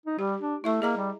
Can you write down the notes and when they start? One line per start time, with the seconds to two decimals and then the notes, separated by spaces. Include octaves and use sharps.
0.06 D#4
0.19 G3 G4
0.41 D4
0.64 A3 E4 E5 C#6
0.82 A#3 G#4 D#5 A#5
0.97 G3